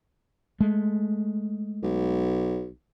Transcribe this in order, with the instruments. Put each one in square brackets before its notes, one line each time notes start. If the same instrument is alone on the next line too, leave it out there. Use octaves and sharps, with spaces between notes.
[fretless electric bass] G#3 A3
[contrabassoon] B1